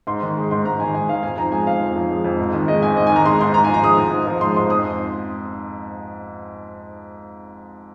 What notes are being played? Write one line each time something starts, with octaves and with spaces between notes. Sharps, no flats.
G#2 C6
D#3
G#3
G#2 C6
G#2 A#5
D#3 G#5
G#3 G#5
G#2 F5
F2 G#5
F3 A#5
G#3 G#5
F2 F5
F2
F3
G#3
F2
G#2
D#3
G#3 D#5
G#2 G#5
G#2 D#5
G#5
D#3 A#5
G#3 C6
G#2 C6
G#2 A#5
G#5
F3
A#5
G#3 D#6
G#2
G#2
F3
G#3 C6
G#2 C6
F2 D#6